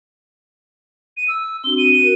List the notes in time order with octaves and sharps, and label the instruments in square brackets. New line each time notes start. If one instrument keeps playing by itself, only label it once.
[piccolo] D#7
E6
[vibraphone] C4 D4 F#4 [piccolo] G7
[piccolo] D#7
[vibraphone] F#4 A#4